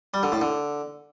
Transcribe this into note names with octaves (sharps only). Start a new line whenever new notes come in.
G3
D3
A2
D3